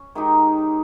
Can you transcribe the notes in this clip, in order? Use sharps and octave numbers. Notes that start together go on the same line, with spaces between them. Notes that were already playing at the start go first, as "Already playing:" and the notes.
Already playing: C#4
D#3 G#3 D#4 G4